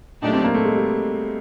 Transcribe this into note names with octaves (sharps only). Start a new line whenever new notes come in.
A#2 F#3 A3 D4 D#4 G4
C4
A#3
A3
G#3
G3